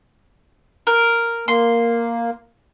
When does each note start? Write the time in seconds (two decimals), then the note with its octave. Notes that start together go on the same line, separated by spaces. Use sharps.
0.87 A#4
1.48 A#3 C6